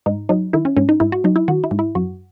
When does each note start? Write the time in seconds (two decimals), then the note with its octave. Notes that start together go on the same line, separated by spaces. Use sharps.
0.06 G#2 D#4
0.29 F#3 D#4
0.53 D#3 E4
0.65 C#4
0.77 G#2 C#4
0.89 D#4
1.00 G#2 E4
1.12 F#4
1.24 F#3 D#4
1.36 E4
1.48 D#3 F#4
1.64 E4
1.71 G#2
1.79 E4
1.95 F#2 F#4